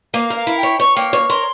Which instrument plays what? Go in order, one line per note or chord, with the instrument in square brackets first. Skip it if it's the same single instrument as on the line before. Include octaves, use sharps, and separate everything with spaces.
[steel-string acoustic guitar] A#3 [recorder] F5
[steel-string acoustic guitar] A#4
[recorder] F5
[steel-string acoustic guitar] E4
[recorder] G5
[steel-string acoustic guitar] C#5
[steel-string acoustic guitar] C#5 [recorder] C#6
[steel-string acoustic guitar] A#3 [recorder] G5
[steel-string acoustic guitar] C#5
[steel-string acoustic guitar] A#4 [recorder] C6